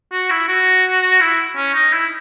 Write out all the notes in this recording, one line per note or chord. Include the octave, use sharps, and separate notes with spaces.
F#4
E4
F#4
E4
C#4
D#4
E4